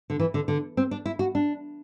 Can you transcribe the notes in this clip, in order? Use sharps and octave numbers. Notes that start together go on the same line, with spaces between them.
D3
E3
D3
D3
C4
D4
E4
F#4
D4